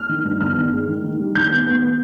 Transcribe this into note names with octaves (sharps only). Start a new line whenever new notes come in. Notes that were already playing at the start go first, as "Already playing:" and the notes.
Already playing: F6
D#3
G2
G1 F6
D#3
G#3
D#3
D#3
G3
D#3 G6
B3
B3
B3